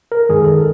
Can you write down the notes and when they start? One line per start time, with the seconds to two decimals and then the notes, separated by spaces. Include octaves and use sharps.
0.12 A#4
0.29 F#2 D#3 G#3 G#4
0.44 A4